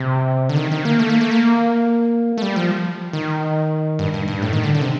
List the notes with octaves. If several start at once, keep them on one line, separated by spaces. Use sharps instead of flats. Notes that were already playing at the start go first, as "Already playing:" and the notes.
Already playing: C3
D3
D#3
D#3
A#3
A3
A#3
A3
A#3
A3
G3
F3
D#3
G2
G2
G2
A2
D#3
D3
D3
C3